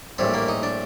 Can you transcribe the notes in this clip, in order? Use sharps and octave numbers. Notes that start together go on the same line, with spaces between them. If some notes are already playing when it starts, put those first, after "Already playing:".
A#1 A2 G3 C4
A#3
D#4
D4